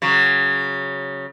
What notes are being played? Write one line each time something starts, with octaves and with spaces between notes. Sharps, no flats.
C#3 F#3